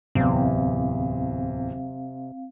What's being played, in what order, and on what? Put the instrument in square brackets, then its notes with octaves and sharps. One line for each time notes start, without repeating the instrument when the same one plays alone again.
[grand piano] D1 E2 [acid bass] C3 [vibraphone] C4 F5